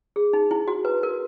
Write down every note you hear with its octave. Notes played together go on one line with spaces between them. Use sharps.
G#4
D#4
E4
F#4
B4
A#4